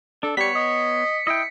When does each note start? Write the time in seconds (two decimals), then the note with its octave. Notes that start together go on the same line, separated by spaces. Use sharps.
0.23 D4 A4
0.37 G3 B3 C#5 B6 C#7
0.55 D#5
1.27 E4 D#5 G5